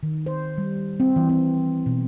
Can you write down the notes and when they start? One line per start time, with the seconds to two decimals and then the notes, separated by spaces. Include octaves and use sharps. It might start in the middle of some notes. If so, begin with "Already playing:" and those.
0.03 D#3
0.26 C5
0.58 G3
1.00 C4
1.16 E3
1.29 C4
1.86 B2